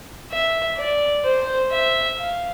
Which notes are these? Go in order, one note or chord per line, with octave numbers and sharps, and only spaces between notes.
E5
D5
C5
E5
F5